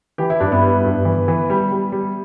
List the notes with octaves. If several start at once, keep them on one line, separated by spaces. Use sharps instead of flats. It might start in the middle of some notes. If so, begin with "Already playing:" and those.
E3 G4
E4
G2 D4
B3 E4
G3
G2
E3
E3
G3
G3
G3